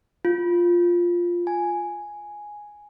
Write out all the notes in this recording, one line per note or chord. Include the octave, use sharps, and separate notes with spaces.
F4
G#5